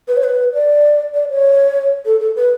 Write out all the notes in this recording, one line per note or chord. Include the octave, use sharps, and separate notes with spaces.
B4
C#5
B4
D5
D5
C#5
A4
A4
B4